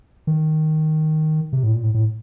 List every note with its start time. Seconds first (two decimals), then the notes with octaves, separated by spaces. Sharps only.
0.27 D#3
1.53 C3
1.63 A2
1.74 A#2
1.83 A2
1.94 A2